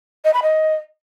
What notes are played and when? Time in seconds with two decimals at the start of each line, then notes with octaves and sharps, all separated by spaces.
0.25 D#5
0.34 B5
0.43 D#5